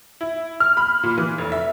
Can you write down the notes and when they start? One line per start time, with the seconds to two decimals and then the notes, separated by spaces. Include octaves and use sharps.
0.21 E4
0.60 F6
0.77 B5
1.03 A#2
1.18 E3
1.38 F1
1.52 E5